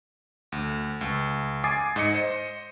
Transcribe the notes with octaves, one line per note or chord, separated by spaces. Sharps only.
D2
C#2
G#5 D6 D#6 A6 C7
G#2 D#5 C#7
C5 D#5